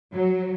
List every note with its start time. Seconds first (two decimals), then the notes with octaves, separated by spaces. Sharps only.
0.13 F#3